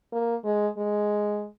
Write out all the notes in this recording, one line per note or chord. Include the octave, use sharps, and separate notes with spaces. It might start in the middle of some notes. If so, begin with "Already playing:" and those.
A#3
G#3
G#3